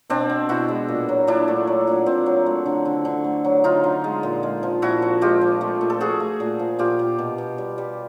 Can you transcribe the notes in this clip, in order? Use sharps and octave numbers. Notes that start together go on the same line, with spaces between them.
B2 C4 D4
B2
B2 E4 F#4
G#3
A#2
F#3
A#2 D4 E4
A3
F#3
A#2
A#2 C4
F#3
A3
D3
D3
D3
A3
F#3
D3 D#4 F4
D3
G#3
A#2
G#3
F3
A#2 E4 F#4
F3
G#3 F4 G4
F3
A3
A#2
A4
A3 F#4 G#4
A3
A#2
F3
A#2 F4 G4
A#2
B2
B2
G3
G3